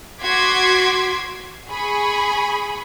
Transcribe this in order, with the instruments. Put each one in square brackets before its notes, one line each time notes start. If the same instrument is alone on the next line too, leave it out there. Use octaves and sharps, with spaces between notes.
[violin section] F#4 C6 D6 G#6 B6
G#4 B5 C#6